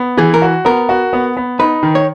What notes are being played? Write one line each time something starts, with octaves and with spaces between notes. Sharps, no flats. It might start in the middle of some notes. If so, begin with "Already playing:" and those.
Already playing: B3
E3 G#4
A#4
F#4
B3 A#4
F#4
B3
B3
D#4 B4
D#3
C#5